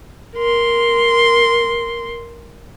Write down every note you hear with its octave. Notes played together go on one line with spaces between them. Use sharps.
A#4 C6